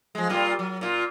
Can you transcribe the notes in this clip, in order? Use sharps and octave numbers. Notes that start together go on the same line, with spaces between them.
F3 G#3
A#2 G3 F4
F#3
A#2 F4